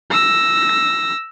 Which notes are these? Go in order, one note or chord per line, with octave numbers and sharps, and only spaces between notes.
E6 A#6